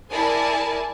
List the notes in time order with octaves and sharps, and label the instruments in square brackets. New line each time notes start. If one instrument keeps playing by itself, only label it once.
[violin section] E4 G#4 A#4 D5 G#5 A5